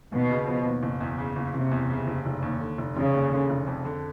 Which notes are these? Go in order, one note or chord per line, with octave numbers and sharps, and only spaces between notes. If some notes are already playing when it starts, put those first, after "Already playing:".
D#2 B2
C#3
F3
D#2
F#1
E2
C#3
F#1
F#1 C3
E2
C#3
F#1
F1
D#2
D3
F1
F1 C#3
D#2
D3
F1
F2
D3